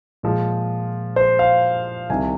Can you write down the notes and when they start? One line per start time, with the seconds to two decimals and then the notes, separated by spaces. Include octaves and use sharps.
0.23 A#2 F3 G#3
1.16 C5
1.39 F5
2.10 C2 C3 D#3 G#5